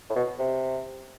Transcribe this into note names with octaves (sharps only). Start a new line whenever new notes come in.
A2
B2
C3